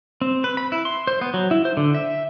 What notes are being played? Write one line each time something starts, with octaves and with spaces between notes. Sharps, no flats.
C4
B4
B5
E4
C6
C5
B3
F#3
E4
C5
D3
E5